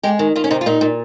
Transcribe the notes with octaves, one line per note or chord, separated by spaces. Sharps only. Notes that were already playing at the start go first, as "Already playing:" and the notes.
G#3 G4
D#3
D#3 F4
C#4
C3 D#4
F4
A#2 D#4
A#2